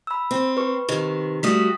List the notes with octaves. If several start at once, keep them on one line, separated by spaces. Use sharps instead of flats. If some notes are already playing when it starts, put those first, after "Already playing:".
B5 E6
C4
B4 C#6
C3 D#3
G3 A3 F#4 D#6 B6